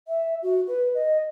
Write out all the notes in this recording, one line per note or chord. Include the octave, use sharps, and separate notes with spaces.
E5
F#4
B4
D#5